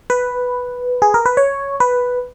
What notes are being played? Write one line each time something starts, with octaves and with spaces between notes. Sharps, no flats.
B4
G#4
A#4
B4
C#5
B4